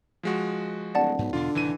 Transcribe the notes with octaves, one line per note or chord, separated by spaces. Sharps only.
F3 G#3 F#4
D1 D5 F#5 A5
B1 G#2
E2 B2 D3 D4 F4
F1 A2 D#3 E3 D#7